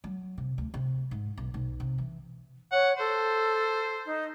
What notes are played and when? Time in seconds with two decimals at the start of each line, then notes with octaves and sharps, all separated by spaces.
0.04 F#3
0.38 C3
0.58 D2
0.74 C3
1.11 G#2
1.38 B1
1.54 B1
1.80 C3
1.98 E3
2.72 C#5 F#5
2.98 A4 C5
4.06 D#4